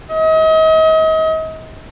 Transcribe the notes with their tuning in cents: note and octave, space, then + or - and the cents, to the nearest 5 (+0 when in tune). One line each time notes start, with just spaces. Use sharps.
D#5 +35